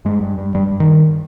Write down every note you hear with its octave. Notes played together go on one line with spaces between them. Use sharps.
G2 G#3
G2
G2
G2 G3
G2
D#3
G2